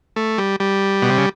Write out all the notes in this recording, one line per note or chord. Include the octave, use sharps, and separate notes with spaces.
A3
G3
G3
B2
C3
C#3